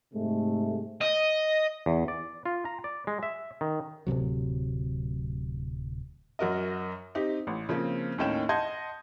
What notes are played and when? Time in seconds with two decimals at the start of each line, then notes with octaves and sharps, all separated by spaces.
0.13 G#2 C3 G#3 A3
1.01 D#5
1.86 E2
2.08 D5
2.46 F4
2.65 A#5
2.84 D5
3.07 G#3
3.23 E5
3.61 D#3
4.07 D1 A#1 C3 F#3
6.39 F#2 F#4 A#4 D#5
7.15 C4 D#4 G4
7.47 A1
7.69 C#3 F3 A#3 C4
8.18 D#2 A2 D#3 C#4 G5 E7
8.49 D#5 F#5 A5 C6 G6 G#6